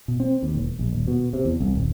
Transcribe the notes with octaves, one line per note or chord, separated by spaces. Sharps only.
B2
C4
D#2
E1
A#1
D#1
B2
C3
E2
C2
D#1